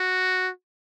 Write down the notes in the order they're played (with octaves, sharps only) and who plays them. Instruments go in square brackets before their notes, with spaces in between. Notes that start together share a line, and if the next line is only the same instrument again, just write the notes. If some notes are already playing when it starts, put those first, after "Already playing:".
Already playing: [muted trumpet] F#4